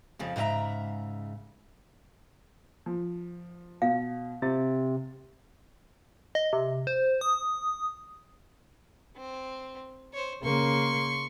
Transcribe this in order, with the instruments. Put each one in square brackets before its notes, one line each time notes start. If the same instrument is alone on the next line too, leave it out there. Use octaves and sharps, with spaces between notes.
[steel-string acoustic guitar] F2 C#3 F3
G#2 C#3 G#4 E5 A#5
[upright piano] F3
[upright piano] B2 [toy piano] F5
[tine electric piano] C3 [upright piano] A6
[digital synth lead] D#5
C3
C5
D#6
[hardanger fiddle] C4
C5 C#5
[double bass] C#3 A#3 [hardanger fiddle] C6 C#6